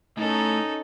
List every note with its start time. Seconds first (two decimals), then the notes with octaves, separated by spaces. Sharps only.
0.18 A2 C#4 D#4 A4